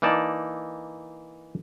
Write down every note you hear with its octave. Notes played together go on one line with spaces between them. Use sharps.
E3 A#3 D#4 D5 A5